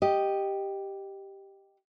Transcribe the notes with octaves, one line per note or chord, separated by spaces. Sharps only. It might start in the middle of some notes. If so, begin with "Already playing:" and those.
G4 D#5